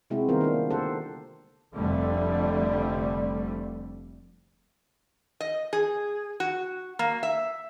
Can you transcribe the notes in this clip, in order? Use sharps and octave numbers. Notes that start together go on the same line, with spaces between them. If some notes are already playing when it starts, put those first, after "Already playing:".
C3 G#3 C4 E4 F#4
D#3 G3 B3 F4 A#4 C5
A#3 D4
C3
D3 G4 A4 C5 F#5
F1 F2 D3 G3 A3
D#5
G#4
F#4
A#3
E5